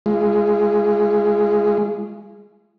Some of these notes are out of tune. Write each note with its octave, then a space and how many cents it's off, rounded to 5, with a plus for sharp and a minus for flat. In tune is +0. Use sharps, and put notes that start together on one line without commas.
G#3 +0 F4 -30